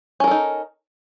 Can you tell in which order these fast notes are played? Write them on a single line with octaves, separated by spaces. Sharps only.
C#4 A#4 A4 D#4